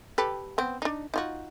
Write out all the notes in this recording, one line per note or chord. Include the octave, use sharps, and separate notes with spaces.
G4 A4 B4
B3 C4
D4 D#4
D#4 F4 F#4